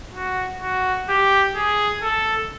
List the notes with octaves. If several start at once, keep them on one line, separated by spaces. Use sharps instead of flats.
F#4
F#4
G4
G#4
A4